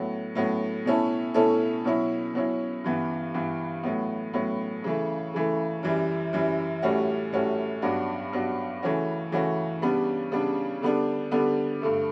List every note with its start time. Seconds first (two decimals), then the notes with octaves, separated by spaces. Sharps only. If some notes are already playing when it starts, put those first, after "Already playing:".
Already playing: A2 F#3 B3
0.35 A2 F#3 B3
0.85 B2 A3 C#4 E4 A4
1.34 B2 A3 C#4 E4 A4
1.84 B2 F#3 C#4 E4
2.34 B2 F#3 C#4 E4
2.84 G2 E3 B3
3.34 G2 E3 B3
3.83 A2 F#3 B3
4.33 A2 F#3 B3
4.84 C#3 E3 A3
5.34 C#3 E3 A3
5.83 F#2 E3 G3
6.33 F#2 E3 G3
6.82 A2 G3 C#4 F#4
7.33 A2 G3 C#4 F#4
7.82 G2 F#3 B3 D4 F#4
8.32 G2 F#3 B3 D4 F#4
8.82 C#3 E3 A3 C#4 F#4
9.32 C#3 E3 A3 C#4 F#4
9.82 C#3 G3 B3 D4
10.32 C#3 G3 B3 D4
10.82 D3 G3 B3 D4
11.31 D3 G3 B3 D4
11.82 G2 D3 A3